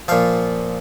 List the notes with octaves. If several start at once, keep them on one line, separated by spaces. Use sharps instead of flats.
A#2 F3 F5